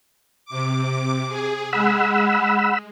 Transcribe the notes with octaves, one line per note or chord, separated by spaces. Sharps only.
C3 D6
G#4
G#3 F#5 B5 E6